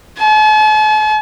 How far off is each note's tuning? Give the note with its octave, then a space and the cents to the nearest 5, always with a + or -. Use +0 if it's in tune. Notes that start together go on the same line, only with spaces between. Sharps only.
A5 -45